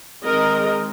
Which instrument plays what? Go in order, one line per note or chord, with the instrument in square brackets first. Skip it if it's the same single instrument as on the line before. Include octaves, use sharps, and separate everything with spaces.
[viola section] D#3 G#3 C4 A#4 D#5